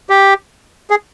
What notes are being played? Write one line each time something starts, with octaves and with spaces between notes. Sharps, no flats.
G4
G#4